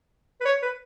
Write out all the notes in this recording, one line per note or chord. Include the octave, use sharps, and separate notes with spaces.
B4
C#5
B4